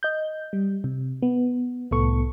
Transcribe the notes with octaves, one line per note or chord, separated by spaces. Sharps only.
D#5 G6
G3
C3
B3
C2 A2 B3 A4 C#6